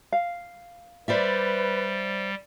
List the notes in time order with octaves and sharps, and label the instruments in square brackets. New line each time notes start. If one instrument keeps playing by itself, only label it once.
[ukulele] F5
[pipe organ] G3 [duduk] B4 [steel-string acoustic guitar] C5 D5 E5